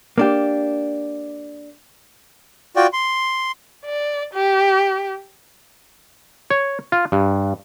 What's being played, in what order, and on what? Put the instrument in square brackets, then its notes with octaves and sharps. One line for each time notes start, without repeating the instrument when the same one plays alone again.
[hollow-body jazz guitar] A#3 D4 G4
[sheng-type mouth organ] F4 F#4 D5 G5
C6
[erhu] D5
G4
[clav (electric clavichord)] C#5
F4
G2